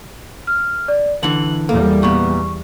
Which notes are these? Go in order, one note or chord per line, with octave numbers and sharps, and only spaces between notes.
F6
D5
D3 E3 F#7
E2 G3 A#3 A4
A#2 B3 C#6